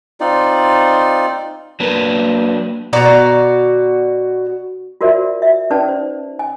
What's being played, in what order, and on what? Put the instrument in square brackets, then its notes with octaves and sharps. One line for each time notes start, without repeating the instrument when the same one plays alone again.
[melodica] C4 D#4 F4 D5
[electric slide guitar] F#3 D4 B4 [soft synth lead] A#3
[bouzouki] B2 F#4 D5 A#5
[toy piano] F4 F#4 A#4 C5 D5 E5
E5
C#4 D#4 B4 D5 A5
C5
G#5